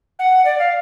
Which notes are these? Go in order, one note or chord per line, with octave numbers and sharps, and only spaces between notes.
F#5
D5
F5